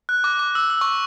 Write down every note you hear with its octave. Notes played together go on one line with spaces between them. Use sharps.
F#6
D6
D6
E6
E6
C#6